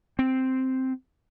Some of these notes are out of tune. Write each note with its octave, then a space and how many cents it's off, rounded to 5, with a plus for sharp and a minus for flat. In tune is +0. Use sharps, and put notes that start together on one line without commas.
C4 -5